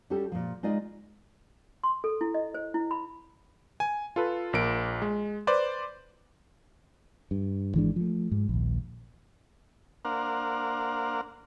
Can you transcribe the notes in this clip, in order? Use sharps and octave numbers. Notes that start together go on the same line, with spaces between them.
G3 C#4 F#4 G4 A4
A#2 F3
G#3 D#4 F4 D5 D#5
C6
A4
E4
D#5
C5
E4
B5
G#5
F4 A4 B4
A#1 A#3 D7
G#3
B4 C5 D5
G2
G#1 E3 G#3 D4
F3 A3
G#2
A#1 D#2
A#3 D4 A#4 C5 F5 F#5